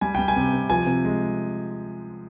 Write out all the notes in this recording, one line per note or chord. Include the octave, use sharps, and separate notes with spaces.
G3 G#5
G3 G5
G#5
C3
C3
F3 G#5
C3
G#3